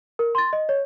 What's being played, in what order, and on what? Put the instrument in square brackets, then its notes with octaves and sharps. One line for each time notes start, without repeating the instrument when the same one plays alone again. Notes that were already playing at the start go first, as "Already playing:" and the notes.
[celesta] A#4
C6 A6
D#5
C#5